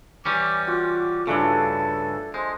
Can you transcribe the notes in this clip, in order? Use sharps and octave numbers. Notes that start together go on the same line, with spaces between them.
E3 G3 C#4 D6
F4 F#4
G2 C#3 A3 D4 E4 A4
G#3 C5